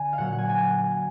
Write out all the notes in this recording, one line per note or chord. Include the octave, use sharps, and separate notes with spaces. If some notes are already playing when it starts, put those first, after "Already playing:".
Already playing: D3 G#5
F5
A#2 F#3 F#5
F#5
G#5
G#5